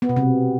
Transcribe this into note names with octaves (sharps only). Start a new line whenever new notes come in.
B3
B2
C3